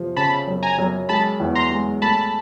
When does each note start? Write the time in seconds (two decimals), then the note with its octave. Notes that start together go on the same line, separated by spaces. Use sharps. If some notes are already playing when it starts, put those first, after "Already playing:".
Already playing: C3 F3
0.17 C#3 A5 B5
0.47 F#2
0.63 G#5 A#5
0.79 F#2
1.09 G#3 A5 B5
1.40 E2
1.55 A#5 C6
1.71 G#3
2.02 A3 A5 B5